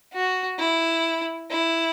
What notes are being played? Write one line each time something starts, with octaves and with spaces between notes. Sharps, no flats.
F#4
E4
E4